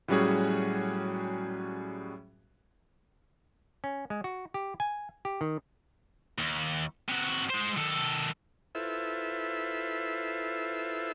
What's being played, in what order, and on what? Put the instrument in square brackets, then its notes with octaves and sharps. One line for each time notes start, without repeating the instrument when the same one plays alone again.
[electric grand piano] A2 F#3 G3 C#4 F#4 G#4
[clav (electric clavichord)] C#4
G#3
F#4
G4
G#5
G4
D#3
[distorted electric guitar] D#2
C3 F#4
G#3 C5
D#3 A4
[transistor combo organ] E4 F4 A4 B4 C5 E5